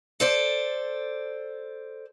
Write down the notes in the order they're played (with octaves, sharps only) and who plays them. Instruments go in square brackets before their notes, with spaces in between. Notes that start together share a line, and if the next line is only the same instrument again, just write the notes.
[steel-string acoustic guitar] A4 C5 D5